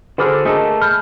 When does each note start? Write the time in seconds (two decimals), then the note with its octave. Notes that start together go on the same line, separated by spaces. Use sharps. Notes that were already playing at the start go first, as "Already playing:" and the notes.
0.18 D3 F#4 G#4 A4 C5 B5 D6 F6
0.45 A3 A#3 G#4 A4 D#5 A5
0.82 B5 F6 G6